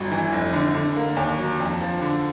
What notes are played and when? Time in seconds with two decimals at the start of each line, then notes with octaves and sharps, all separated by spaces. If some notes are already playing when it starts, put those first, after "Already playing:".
Already playing: G1 F#3
0.12 E3
0.32 F1
0.53 D3
0.74 D3
0.96 A#3
1.17 D#2
1.38 F#3
1.60 F2
1.81 F3
2.02 D3